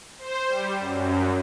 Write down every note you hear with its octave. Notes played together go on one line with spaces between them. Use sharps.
C5
G3
F#2